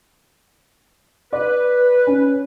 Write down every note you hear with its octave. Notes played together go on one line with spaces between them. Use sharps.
B4 D5
C#4